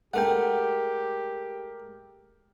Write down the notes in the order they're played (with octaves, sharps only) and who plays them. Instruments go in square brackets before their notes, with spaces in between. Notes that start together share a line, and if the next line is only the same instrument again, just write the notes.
[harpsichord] G#3 A3 [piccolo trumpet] G4 [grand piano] A4 A#4 [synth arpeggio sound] F#5 G5